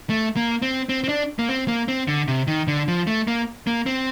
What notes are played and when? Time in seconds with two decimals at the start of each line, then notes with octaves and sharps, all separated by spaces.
0.10 A3
0.36 A#3
0.62 C4
0.89 C4
1.04 C4
1.09 D4
1.39 A#3
1.49 C4
1.68 A#3
1.88 C4
2.08 D3
2.28 C3
2.47 D#3
2.68 D3
2.88 F3
3.07 A3
3.27 A#3
3.67 A#3
3.86 C4